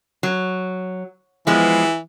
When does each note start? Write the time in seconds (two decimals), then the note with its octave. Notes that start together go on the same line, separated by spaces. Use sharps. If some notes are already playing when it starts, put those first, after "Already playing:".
0.23 F#3
1.47 E3 F3 G#3 B3